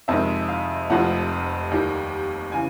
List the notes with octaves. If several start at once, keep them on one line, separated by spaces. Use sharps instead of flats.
F2 C3 D#3 G#3 E5
F5
F1 F2 C3 F3 A3 F#5
D#2 D#3 G3
C#3 E3 G#5